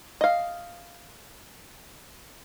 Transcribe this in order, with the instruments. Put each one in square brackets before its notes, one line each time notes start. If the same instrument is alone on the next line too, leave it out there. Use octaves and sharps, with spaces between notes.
[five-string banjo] D#5 F5